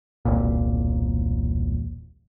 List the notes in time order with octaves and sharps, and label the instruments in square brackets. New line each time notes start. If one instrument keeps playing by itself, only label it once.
[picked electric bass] E1 C2 A#2